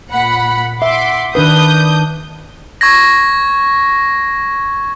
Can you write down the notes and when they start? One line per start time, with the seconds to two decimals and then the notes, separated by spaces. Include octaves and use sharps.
0.10 A#2 F#5 B5
0.82 E5 F#5 C6 D6
1.35 D#3 D4 B4 D#6 G6
2.81 C#6 G#6 A#6